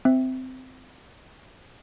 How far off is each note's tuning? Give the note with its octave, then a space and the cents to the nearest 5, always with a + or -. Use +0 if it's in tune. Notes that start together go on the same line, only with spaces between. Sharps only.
C4 -15 E5 +0